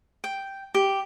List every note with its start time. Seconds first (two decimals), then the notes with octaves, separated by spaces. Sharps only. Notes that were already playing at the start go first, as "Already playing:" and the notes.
0.24 G5
0.74 G4